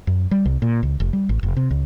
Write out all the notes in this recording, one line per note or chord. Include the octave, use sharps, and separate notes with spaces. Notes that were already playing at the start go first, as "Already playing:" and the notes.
F#2
G3
C2
A#2
C#2
F1
G3
A1
F1
C3
C#2